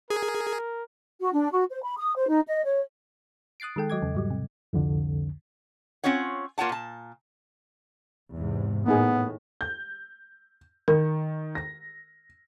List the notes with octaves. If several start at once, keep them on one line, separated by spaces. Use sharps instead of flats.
G#4 A#4
F#4
D4
F#4
C5
B5
D#6
C5
D#4
D#5
C#5
D#6 F#6 A6 C7 D7
D#3 G#3 A4 G5
F#3 D#5 D6 G#6
E2 C#3
G#2 F#3 G3
C3
C2 F2 D3
C4 C#4 F4 C#5 F#5
A#3 F4 C#5 F#5 A5
A#2 A5
E2 G#2 C3
A2 A#3 B3 D#4 G#4
G6
D#3 A#4
A#6